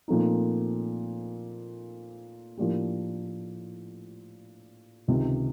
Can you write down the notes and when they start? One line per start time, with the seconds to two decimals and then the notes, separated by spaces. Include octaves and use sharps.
0.08 A#2 F3 A3 C4 D#4
2.58 A2 F3 A#3 D4 G4
5.08 C#2 C3 D#3